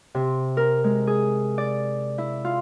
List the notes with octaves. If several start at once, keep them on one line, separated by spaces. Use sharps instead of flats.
C3
A#4
G#3
G#4
D5
E4
F4